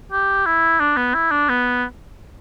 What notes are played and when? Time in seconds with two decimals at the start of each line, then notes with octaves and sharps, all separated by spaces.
0.12 G4
0.46 E4
0.80 D4
0.97 B3
1.14 E4
1.31 D4
1.49 B3